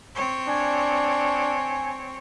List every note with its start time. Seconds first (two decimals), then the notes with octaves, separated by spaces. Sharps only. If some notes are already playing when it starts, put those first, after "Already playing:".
0.15 C4 C#5
0.48 D4 G#5